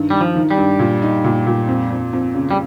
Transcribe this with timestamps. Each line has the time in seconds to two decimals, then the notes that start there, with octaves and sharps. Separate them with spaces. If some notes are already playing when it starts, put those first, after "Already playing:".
Already playing: G2 D#3
0.10 D#3 G3
0.21 F3
0.36 D#3
0.51 G3
0.57 G2
0.79 A#2
1.02 D#4
1.24 A#2
1.47 A#2
1.68 F2
1.91 F2
2.13 F2
2.35 C#3
2.51 G3